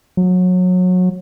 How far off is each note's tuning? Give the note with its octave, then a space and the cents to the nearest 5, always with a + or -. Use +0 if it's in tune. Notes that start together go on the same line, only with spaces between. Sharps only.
F#3 -25